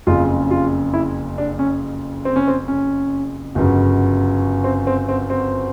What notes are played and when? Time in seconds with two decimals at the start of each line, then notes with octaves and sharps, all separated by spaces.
0.07 F#1 F2 C#3 F4
0.51 F4
0.94 E4
1.38 D4
1.59 C#4
2.25 C4
2.36 C#4
2.48 C4
2.68 C#4
3.55 G1 F#2 C#3
4.64 C4
4.87 C4
5.09 C4
5.30 C4